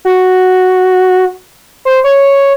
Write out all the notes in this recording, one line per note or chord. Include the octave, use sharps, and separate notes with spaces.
F#4
C5
C#5